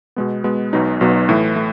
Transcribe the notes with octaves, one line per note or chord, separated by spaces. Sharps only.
B2 G#3 B3
B2 G#3 B3
B1 B2 F#3 B3 D#4
B1 B2 F#3 B3 D#4
A2 E3 A3
A3